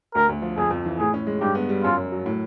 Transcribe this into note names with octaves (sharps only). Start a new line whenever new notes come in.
D2 A#4
D2
F3
F2 G#4
F2
E3
A2 G#4
C#4
G#3
G2 G4
B3
G3
F#2 F4
F#2
F#3
A2